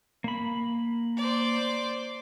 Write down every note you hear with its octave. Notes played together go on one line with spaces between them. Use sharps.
A#3 B5
C5 D5